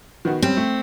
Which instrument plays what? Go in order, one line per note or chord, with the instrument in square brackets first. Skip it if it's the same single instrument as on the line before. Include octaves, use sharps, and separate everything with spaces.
[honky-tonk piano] D#3 B3 F#4
[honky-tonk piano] G3 C#4 [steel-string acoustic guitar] C4
[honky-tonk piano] A3